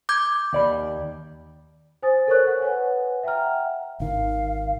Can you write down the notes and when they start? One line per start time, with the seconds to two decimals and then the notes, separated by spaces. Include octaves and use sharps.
0.09 D6 G6 G#6
0.53 D#2 D5 B5
2.03 C5 G#5 D#6 A6
2.28 A4 A#4 C5 C#5 C#6 F#6
2.47 F#5
2.62 B4 C#5 F#5 G#5
3.23 E5 F#5 G5 A#5 F6
4.00 G#1 D#3 F5